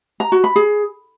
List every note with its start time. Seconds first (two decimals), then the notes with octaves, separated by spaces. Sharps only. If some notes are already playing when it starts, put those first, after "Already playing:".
0.20 A#5
0.32 F#4
0.44 B5
0.56 G#4